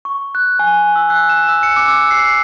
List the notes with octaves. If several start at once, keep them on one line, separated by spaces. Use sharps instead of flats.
C#6
F#6
G#5
G#5
E6
F#6
E7
E6
C#7
D6
E6
C7